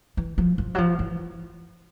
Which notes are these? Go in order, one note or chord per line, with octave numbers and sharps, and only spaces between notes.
E3
F3
F3
F#3
F3
E3